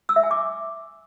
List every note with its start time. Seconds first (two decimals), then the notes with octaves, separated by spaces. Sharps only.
0.09 E6
0.16 E5
0.23 G#5
0.31 D6